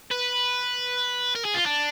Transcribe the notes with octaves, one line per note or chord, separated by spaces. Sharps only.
B4
A#4
G#4
F4
D4